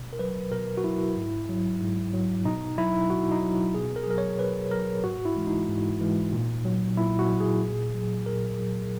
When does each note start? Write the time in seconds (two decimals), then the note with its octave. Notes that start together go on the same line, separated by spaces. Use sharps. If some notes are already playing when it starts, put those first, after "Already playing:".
Already playing: B2
0.13 A#4
0.19 F#3 B4
0.52 B2 A#4
0.77 F#4
0.84 F#3 E4
1.16 G#2
1.49 F#3
1.81 G#2
2.13 F#3
2.45 B2 D#4
2.78 F#3 E4
3.10 B2 F#4
3.31 D#4
3.43 F#3
3.74 B2 G#4
3.96 A#4
4.03 G#4
4.07 F#3 A#4
4.18 C#5
4.39 B2 B4
4.71 F#3 A#4
5.04 G#2 F#4
5.25 E4
5.36 E3 G#3
5.47 D#4
5.68 G#2
6.01 E3 G#3
6.32 A#2
6.64 F#3
6.97 A#2 E4
7.19 F#4
7.29 F#3
7.40 G#4
7.62 A#2
7.94 F#3
8.26 A#2 A#4
8.58 F#3